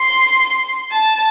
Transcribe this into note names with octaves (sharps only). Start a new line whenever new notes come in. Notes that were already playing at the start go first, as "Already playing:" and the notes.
Already playing: C6
A5